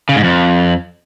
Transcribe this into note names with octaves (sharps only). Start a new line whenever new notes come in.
C#3
G#2
F2